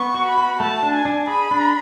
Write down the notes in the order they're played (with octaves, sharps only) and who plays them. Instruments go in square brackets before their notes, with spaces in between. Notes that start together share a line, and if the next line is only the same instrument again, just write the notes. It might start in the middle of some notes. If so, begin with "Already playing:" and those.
Already playing: [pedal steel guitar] B3 [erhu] C#6
[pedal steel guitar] F#4
[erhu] B5
[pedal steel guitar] F#4
[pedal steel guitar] A3 [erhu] A5
[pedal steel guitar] D4
[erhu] G#5
[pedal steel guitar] D4
[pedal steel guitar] G#4 [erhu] B5
[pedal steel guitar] D4